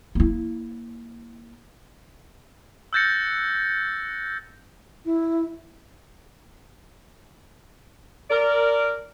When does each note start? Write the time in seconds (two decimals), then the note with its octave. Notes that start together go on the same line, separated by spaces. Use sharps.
0.15 A#3 E4
2.93 E6 F#6 G6 A6 A#6 C#7
5.06 E4
8.30 A#4 D5